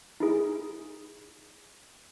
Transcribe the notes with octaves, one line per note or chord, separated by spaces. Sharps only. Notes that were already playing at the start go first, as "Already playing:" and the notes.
D#4 E4 G#4